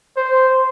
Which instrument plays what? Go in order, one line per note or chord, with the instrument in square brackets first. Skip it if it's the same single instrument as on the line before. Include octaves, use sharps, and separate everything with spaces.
[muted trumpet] C5